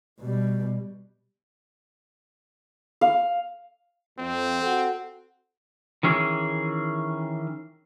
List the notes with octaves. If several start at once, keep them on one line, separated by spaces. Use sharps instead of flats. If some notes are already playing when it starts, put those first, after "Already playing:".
B2 G3
F5
F2 C4
F#4 A4 F#5
D#3 E3 C#4 G#4